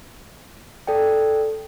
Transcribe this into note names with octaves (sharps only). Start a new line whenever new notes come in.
A4 D5 G5